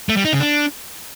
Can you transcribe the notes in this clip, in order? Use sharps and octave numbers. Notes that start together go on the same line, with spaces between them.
A3
G3
D#4
C#3
D4